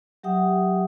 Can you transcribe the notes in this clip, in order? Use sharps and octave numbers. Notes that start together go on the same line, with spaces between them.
F#3 G4 E5 F#5 G5 D#6